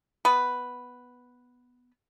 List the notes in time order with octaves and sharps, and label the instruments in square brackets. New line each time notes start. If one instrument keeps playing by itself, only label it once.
[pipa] B3 B4